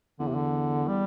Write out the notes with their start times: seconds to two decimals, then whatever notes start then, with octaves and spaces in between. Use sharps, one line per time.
0.20 E2 D3
0.28 C3
0.35 D3
0.88 G3